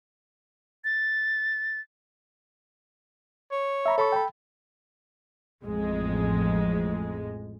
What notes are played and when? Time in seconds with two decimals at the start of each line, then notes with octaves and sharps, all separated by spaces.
0.84 A6
3.52 C#5
3.86 E5 A#5 B5
3.98 A4 C#5 B5 C#6
4.12 G5 B5
5.63 A1 F2 G#3